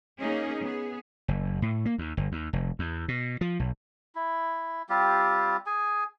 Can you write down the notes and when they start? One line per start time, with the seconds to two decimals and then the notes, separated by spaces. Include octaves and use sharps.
0.20 A#3 C#4 D#4 G#4
0.61 B3 G#4
1.28 F#1
1.62 A2
1.86 A#3
1.98 D#2
2.17 G1
2.32 D#2
2.53 F1
2.79 E2
3.08 B2
3.41 F3
3.59 B1
4.15 E4
4.89 G3 C4 F4 G4
5.66 G#4 G#5